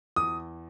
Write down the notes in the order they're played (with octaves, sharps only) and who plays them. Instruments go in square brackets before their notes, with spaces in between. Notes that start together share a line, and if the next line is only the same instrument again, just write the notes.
[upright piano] E2 D#6